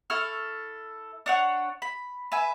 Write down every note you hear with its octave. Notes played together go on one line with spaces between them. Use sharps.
E4 A4 C#6 F6
D4 C#5 F#5
B5
B4 E5 G#5